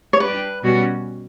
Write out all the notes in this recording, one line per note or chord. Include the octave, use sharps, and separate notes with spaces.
C#5
G3 D4 G4 B4 D5
B2 G3 C#4 F#4